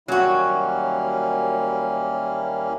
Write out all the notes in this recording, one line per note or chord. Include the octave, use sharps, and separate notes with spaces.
D#2 F#3 G3 A#3 C#4 E4 F#4 F6